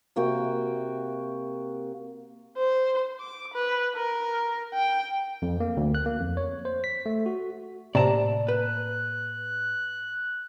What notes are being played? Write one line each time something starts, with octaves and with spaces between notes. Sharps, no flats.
C3 A#3 F#4 G5
C5
D6
B4
A#4
G5
F2
A#3
D2
F#6
A#3
F2
C#5
C5
B6
A3
F#4
A2 C3 A#3 D5 A5 A#5
B4 F#6